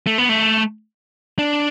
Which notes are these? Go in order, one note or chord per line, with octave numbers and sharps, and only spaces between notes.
A3
B3
A3
D4